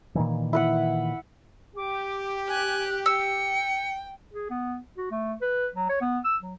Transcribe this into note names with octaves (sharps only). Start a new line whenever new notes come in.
A#2 D#3 E3
E4 B4 F#5
G4 D6
G#5 F#6
G5 E6 C#7
G#4
B3
F#4
A3
B4
F#3
C#5
B3
E6
F#3